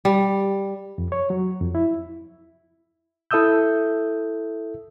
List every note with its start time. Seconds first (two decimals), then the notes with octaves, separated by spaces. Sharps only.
0.05 G3
0.98 F2
1.12 C#5
1.30 F#3
1.61 F2
1.75 E4
3.31 E4 A4 E5 D#6 E6 G6